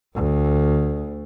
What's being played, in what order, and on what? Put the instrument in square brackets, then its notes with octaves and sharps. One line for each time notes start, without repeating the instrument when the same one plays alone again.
[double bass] D2